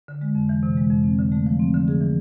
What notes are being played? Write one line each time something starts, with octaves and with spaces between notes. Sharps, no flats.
D3
G#3
F2
E3
C3
G#3
F2
C4
D3
A3
F3
C4
D3
G#4
E3